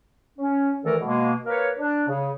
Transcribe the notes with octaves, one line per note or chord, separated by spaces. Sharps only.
C#4
D2 D#3 E3 A3 A4 A#4
B2 G#3 A#3
A#3 A#4 B4 C#5
D4
C#3